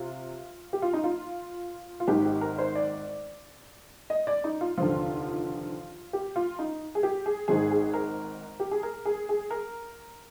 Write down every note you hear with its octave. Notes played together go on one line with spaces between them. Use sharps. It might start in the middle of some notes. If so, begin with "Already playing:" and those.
Already playing: C3 F4
G4
F4
D#4
F4
F4
G#1 G#2 D#3 G4
G4
A#4
C5
D5
D#5
D5
D#4
F4
F1 D#2 D3 F3 F4
G4
F4
D#4
G#4
G4
G#4
G#1 G#2 D#3 G#4
G#4
A#4
G4
G#4
A#4
G#4
G#4
A#4